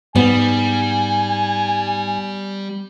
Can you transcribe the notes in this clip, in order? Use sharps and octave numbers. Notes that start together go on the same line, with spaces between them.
G#2 G3 B3 G#5